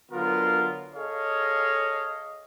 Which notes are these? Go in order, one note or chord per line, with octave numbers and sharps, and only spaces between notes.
D3 F#3 B3 F4 A#4
G#4 A4 C#5 D#5 F5